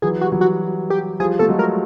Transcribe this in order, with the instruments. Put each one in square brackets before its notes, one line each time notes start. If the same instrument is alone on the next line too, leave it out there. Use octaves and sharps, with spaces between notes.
[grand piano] E3 F#3 [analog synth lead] G#4
[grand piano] G3 [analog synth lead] F#4
[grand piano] E3 F#3
[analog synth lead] F#4
G4
[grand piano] F3 G3 [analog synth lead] G#4
[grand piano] A3 [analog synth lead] A4
[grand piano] F#3 G#3
[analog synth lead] A#4